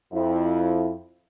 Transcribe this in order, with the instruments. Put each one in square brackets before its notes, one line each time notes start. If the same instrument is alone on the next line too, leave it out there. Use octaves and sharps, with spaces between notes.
[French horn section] F2 E4